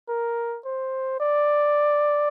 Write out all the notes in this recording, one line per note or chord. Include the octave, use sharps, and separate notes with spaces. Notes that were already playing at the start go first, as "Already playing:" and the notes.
A#4
C5
D5